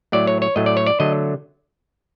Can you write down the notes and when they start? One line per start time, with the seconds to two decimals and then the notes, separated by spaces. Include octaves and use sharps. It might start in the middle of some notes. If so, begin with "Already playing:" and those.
0.12 A2 F#3 A3 D5
0.27 C#5
0.42 C#5
0.56 A2 F#3 A3 D#5
0.66 D5
0.77 C#5
0.87 D5
1.00 D3 F#3 A3 D#5